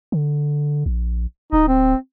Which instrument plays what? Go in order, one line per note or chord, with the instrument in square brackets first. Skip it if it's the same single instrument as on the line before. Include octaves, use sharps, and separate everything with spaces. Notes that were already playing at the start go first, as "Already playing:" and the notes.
[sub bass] D3
A#1
[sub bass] D1 [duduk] D#4
[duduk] C4